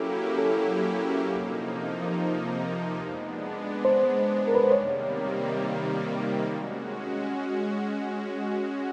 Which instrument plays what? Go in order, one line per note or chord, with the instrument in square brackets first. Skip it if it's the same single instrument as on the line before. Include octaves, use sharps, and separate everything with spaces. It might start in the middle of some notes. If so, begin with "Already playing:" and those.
Already playing: [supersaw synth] F#3 A#3 C#4 E4 G4 [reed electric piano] A4
[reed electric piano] A4
[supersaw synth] C3 F3 A#3 D#4
G#3 B3 D4
[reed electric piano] C5
A#4
B4
C5
[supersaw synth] C3 D#3 G3 A#3 [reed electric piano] C#5
[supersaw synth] G#3 C#4 F#4